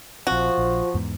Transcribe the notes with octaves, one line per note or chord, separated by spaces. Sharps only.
A#1 F3 C4 F#4
A#1
E2 G#2 B3